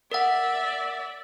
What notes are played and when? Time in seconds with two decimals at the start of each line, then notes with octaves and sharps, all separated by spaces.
0.12 A#4 D5 E5 F#5